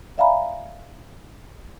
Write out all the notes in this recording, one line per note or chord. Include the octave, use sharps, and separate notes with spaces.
D5 E5 F5 G#5 A#5 B5